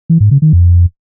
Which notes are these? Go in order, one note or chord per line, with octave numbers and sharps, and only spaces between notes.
E3
G#2
C#3
D#3
F2